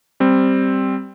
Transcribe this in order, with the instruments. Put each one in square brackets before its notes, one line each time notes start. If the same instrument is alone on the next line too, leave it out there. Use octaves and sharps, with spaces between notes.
[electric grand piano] G3 C4